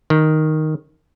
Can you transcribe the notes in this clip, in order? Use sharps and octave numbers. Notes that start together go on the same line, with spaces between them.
D#3